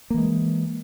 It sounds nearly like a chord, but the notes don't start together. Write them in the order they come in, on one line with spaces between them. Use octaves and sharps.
A#3 E3 G#3